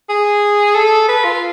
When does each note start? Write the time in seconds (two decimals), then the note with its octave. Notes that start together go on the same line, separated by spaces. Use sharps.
0.09 G#4
0.75 A4
1.08 B4
1.24 F4